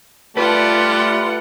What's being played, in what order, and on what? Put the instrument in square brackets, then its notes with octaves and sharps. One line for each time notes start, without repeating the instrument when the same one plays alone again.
[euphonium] A3 [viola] F4 F#5 [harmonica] G4 D5 A5 [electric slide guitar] B4